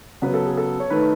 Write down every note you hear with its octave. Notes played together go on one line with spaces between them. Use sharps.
C#3 F#3 B3 B4
A4
G#4
A4
C#5
D#3 A3 B4